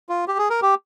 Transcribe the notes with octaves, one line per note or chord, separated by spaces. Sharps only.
F4
G4
G#4
A#4
G4